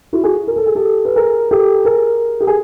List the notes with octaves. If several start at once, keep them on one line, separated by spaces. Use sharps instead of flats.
E4 F#4
F#4 G#4
A#4
A4
G#4
G4 A4
B4
G#4 A#4
G4 A4
G#4 A#4
G4
G#4